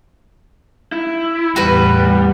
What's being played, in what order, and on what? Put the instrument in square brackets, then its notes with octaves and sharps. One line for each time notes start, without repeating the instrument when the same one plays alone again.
[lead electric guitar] E4
[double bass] E2 A2 [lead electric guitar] G3 [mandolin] F#4 B4